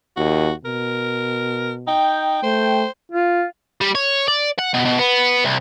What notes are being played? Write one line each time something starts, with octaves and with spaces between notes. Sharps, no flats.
D#2 F#4
B2 A#4
D#4 G5
A3 C5
F4
G3
C#5
D5
F#5
B2
B2
B3
C2